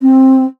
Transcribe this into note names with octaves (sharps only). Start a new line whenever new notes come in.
C4